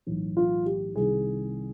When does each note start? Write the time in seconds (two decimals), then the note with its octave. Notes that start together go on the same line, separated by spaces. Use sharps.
0.07 B1 A2 E3
0.37 F4
0.66 G4
0.95 C2 C3 D#3 G#4